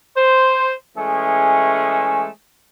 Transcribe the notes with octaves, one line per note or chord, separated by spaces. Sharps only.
C5
E3 G#3 A3 C#4 G#4